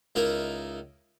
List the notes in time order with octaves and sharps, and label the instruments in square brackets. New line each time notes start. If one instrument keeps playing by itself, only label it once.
[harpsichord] C#2 D#4 E4 A#4